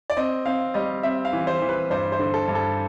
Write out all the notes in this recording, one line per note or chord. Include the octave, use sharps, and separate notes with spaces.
D5
C4 D#5
C4 F5
G3 D#5
C4 E5
F5
E3
C5
E3
B4
G2 C5
C5
D3
A4
G2
A4